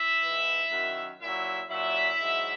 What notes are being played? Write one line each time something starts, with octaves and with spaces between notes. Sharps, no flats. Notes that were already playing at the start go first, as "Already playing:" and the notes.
Already playing: E4 E5
G#2 E3
F#2 D#3 F#3
A#2 F#3 E4 E5
A#2 F#3 E4 E5
G#2 F#3